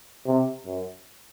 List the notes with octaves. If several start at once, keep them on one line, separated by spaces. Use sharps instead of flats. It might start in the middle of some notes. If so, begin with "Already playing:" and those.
C3
F#2